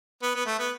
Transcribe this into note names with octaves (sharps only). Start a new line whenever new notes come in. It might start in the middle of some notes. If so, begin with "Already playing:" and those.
B3
B3
A3
B3